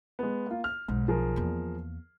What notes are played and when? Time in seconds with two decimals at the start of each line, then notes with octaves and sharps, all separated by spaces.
0.19 G#3 B3
0.47 A#3 F4
0.64 F6
0.88 B1 G#2
1.08 F3 G#4 A#4
1.36 E2 A#3